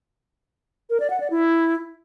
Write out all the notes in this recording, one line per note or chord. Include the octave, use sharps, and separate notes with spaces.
A#4
D5
F#5
D5
E4